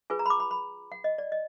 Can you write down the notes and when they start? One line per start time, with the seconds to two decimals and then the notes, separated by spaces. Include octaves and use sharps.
0.10 F4 G#4 B4 G#5
0.19 A#5
0.26 B5
0.30 D6
0.40 B5
0.51 B5
0.92 F#5
1.04 D#5
1.18 D5
1.32 D#5